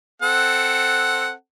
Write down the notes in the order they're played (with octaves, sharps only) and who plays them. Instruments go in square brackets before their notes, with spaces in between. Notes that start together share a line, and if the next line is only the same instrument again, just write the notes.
[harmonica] C4 A4 F#5